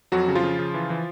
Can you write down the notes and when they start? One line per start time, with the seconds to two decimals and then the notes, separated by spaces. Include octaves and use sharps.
0.12 F2 F#3 F#4
0.28 C#3
0.35 F3 F4
0.43 C#3
0.59 C#3
0.74 E3
0.90 E3